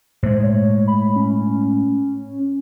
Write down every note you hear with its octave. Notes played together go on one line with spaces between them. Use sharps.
A2 G#3 C5
C#5
B5
C#4